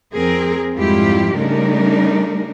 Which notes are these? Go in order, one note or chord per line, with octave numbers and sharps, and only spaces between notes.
F2 C4 G#4 A#4
F2 G#2 G3 E4 F4 G4
C#3 G3 A3 D4 D#4 A#4